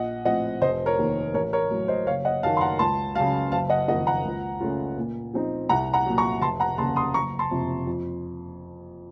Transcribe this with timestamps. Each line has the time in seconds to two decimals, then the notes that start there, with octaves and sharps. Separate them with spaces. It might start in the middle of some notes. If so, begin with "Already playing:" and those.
Already playing: A#1 D#5 F#5
0.25 A2 F3 C4 D#5 F#5
0.62 F1 C5 D#5
0.86 A#4 C#5
0.98 D#2 D#3 A#3
1.34 A1 A#4 C#5
1.53 A#4 C#5
1.70 A2 F#3
1.88 C5 D#5
2.06 F#1 C#5 F5
2.25 D#5 F#5
2.43 F#2 D#3 F5 A5
2.57 C6
2.61 F#5 A#5
2.79 C#2 A5 C6
3.15 C#3 F#3 F5 A5
3.52 F#1 F5 A5
3.70 D#5 F#5
3.88 F2 D#3 A#3 D#4 D#5 F#5
4.07 F#5 A#5
4.24 C#2
4.60 C#3 A3 C#4 F4
4.97 A#2
5.34 F3 C4 D#4
5.69 C2 F#5 A#5
5.94 F#5 A#5
6.06 A#2 F#3
6.18 A#5 C#6
6.41 F1 A5 C6
6.60 F#5 A#5
6.78 D#2 C#3 A5 C6
6.96 C6 D#6
7.14 F#1 A#5 C#6
7.39 A5 C6
7.51 F2 C3
7.87 F2